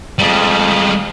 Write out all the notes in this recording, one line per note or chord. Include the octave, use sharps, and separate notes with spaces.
F2 G3 G#3